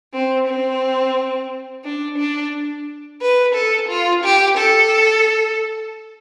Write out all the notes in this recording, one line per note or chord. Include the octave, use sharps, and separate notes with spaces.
C4
C4
D4
D4
B4
A4
F4
G4
A4